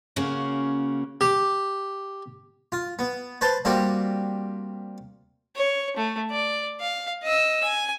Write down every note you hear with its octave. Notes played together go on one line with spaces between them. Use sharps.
C#3 A#3 C#4 F#4
G4
F4
B3
B4 C5 A5
G3 A#3 C4 F#4 G4
C#5
A3
D5
F5
D#5 E6
G#5